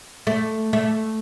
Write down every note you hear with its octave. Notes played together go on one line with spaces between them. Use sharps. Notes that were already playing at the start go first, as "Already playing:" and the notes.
A3
A3